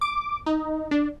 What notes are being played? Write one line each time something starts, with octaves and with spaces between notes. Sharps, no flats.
D6
D#4
D4